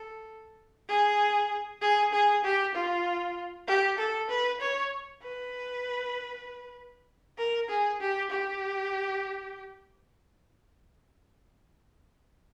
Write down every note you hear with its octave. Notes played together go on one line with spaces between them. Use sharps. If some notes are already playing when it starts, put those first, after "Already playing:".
Already playing: A4
G#4
G#4
G#4
G4
F4
G4
A4
B4
C#5
B4
A#4
G#4
G4
G4